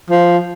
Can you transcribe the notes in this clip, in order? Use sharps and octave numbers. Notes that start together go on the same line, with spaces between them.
F3